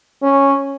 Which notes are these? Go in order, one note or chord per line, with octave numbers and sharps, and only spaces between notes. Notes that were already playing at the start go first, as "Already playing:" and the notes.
C#4